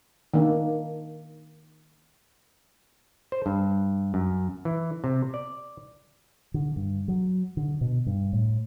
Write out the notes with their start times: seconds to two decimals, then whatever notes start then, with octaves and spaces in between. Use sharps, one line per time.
0.34 D#3 A#3 D4
3.32 C5
3.46 G2
4.14 F#2
4.65 E3
5.04 C3
5.34 D5
6.54 D3
6.76 G2
7.08 F#3
7.57 D3
7.81 B2
8.06 G2
8.33 A2